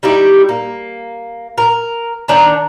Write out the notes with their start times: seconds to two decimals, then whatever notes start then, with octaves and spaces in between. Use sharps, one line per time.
0.03 G3 D#4 E4 G4
0.49 A#3
1.58 A#4
2.28 D#3 D4 A5 A#5